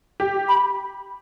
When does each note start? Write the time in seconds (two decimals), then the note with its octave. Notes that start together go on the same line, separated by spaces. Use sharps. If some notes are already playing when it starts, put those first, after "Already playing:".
0.20 G4
0.49 B5